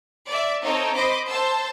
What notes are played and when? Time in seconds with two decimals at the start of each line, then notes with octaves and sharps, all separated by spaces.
0.28 D5 E5
0.63 C4 D#4 A4 C#5 G5
0.95 C5 D#5 B5 D6
1.28 C5 A5 E6